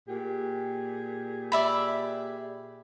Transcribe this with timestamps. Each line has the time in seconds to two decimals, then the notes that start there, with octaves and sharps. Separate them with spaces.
0.08 A#2 G4 G#4
1.52 D5 E5 B5